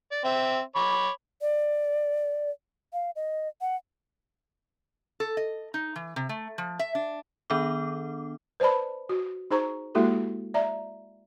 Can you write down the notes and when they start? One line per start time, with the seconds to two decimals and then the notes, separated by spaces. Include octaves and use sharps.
0.12 D5
0.24 C4 C5 E5
0.76 C#5 B5 D6
1.41 D5
2.93 F5
3.16 D#5
3.61 F#5
5.20 A4
5.37 D#5
5.74 D#4
5.96 E3
6.16 C3
6.29 A3
6.58 F3
6.79 E5
6.95 D4
7.50 D#3 B3 D4 A4 D6
8.60 B4 C5 D5 A5 B5
9.09 F#4
9.51 D#4 G#4 C5 A#5 C#6
9.95 G#3 A#3 E4 F#4 G4 A4
10.54 D5 E5 A#5